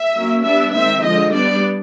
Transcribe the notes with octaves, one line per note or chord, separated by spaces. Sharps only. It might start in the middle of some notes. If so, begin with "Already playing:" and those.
Already playing: E5
F#3 A#3 C#4
G3 B3 D4 E5
D#3 G#3 C4 E5
D3 F3 G#3 D#5
G3 B3 D4 D5